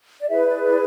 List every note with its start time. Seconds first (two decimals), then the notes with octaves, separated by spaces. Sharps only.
0.20 D5
0.29 E4 G#4 B4 E5
0.47 D5
0.64 D5